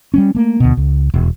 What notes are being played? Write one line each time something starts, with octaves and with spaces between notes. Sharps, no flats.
G3 G#3 C#4
A3 A#3
D2 B2
C#2
E1